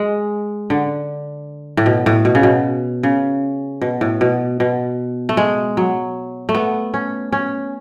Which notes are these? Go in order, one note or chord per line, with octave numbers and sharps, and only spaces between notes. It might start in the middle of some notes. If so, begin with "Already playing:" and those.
Already playing: G#3
D3
A2
B2
A2
B2
C#3
B2
C#3
B2
A2
B2
B2
A3
G#3
F#3
A3
B3
C#4
C#4